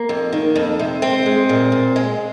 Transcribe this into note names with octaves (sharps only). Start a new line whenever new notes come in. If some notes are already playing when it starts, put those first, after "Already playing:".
Already playing: A#3
F2
D#3
F2
C3
G#3 C4
G#3
A#2
A#2
G#3